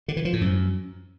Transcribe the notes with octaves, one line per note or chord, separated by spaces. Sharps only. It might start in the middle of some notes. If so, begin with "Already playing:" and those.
D3
E3
F3
A2
F#2